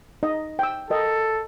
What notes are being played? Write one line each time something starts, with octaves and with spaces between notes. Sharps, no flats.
D#4 D#5
G5 E6
A4 A#4 D#5 G5